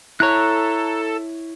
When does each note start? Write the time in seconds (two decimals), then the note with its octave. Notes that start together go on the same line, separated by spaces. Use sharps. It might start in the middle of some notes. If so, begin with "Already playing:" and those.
0.20 E4 A4 C#5 A#5 F#6